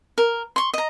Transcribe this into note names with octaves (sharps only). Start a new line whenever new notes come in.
A#4
C6 C#6
D#5 A#5